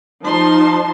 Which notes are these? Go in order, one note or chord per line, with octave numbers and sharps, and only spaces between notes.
F3 D#4 A5 C6